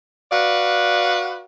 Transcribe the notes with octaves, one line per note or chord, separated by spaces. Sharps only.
F#4 B4 D5 F5